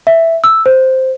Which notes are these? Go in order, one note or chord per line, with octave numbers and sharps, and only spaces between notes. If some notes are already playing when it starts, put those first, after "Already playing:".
E5
E6
C5